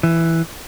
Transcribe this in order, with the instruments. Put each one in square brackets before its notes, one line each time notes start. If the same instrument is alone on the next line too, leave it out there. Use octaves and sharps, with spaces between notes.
[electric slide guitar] E3